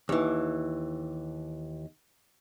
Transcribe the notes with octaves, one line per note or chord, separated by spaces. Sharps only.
D#2 E3